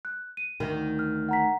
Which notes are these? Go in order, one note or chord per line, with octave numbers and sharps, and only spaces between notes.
F#6
D#7
D2 D#3
F6
F#5 A#5 B6